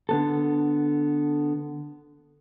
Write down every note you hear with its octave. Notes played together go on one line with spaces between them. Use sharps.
D3 B3 A4